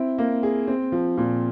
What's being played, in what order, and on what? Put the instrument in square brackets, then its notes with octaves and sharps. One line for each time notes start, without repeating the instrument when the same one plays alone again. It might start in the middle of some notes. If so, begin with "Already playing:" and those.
Already playing: [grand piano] C4 E4
A#3
G#4
C4
F3
A#2